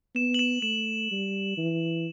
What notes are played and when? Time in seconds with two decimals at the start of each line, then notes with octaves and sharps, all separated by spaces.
0.15 B3 E7
0.34 F#7
0.39 E7
0.62 A3 E7
1.11 G3
1.57 E3